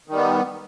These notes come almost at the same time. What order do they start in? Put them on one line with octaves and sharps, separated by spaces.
D#3 G3 B3